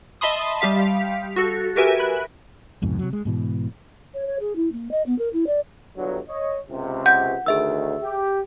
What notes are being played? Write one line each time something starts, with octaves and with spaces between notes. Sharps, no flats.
D#5 E5 A5 B5 C6 D#6
G3 G4 F5 B6
F#4 A4
F#4 G4 A#4 B4 E5 G#5
B5 F#6
C2 F2 G#2 B2
C3 D#3 F#3
G#3
G#2 B2 E3
C#5
C#5
G#4
E4
A#3
D#5
B3
A#4
E4
D5
G1 G2 F#3
C#5 D#5
C#2 C3
F#5 G6
D2 D#3 G#4 E5 E6
G4